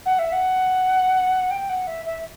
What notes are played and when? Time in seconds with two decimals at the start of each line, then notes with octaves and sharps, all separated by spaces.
0.05 F#5
0.19 E5
0.32 F#5
1.51 G5
1.69 F#5
1.87 E5
2.05 E5